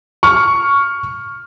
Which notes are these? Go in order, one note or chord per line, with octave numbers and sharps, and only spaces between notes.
C#6 F6